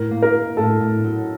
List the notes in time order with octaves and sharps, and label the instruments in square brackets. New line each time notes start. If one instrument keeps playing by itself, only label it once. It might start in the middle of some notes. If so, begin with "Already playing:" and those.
Already playing: [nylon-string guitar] A2 [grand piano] A#4
[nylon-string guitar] A#3
[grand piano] A#4
[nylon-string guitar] A#3
[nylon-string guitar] A2 [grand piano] A4
[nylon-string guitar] A2
F#3